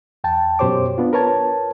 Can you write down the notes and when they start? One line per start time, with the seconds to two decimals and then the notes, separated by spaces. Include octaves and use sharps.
0.24 E2 G5 A5
0.59 F#2 B2 G4 C5 C#5 D6
0.98 B3 D4 F4
1.13 A#4 B4 C#5 A5 G#6